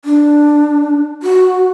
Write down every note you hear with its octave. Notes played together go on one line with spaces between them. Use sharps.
D4
F#4